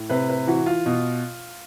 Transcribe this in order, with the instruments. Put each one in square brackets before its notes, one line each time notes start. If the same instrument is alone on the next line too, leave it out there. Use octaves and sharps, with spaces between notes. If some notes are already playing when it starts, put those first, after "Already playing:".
Already playing: [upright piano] A2
C3 B4
B4
E3 F#4
F4
B2